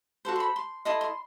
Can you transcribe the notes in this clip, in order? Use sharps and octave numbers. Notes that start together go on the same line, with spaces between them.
F#4 A4 C5
C6
B5
C6
E4 A4 D#5 C6
C6